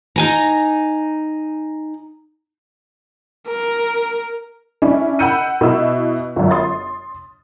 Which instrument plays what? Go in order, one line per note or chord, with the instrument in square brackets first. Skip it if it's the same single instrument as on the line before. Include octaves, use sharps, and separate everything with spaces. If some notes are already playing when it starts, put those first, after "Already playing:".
[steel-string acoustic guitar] D#4 G#5 A#5
[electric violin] A#4
[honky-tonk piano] C#4 D4 E4
F#5 B5 E6 G6 C#7 D#7
B2 E4 E6
G1 F#2
C6 D#6 A6